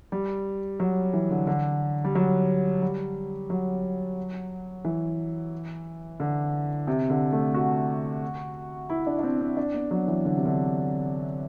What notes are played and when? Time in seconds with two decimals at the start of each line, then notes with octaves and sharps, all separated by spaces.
0.12 G3
0.80 F#3
1.14 E3
1.31 D3
1.47 D3
2.04 G3
2.15 F#3
2.82 G3
3.50 F#3
4.85 E3
6.20 D3
6.87 C3
7.10 D3
7.32 A3
7.54 F#4
8.90 E4
9.07 D4
9.19 D4
9.23 C4
9.41 C4
9.57 D4
9.74 B3
9.91 F#3
10.08 E3
10.25 D3
10.35 C3
10.45 D3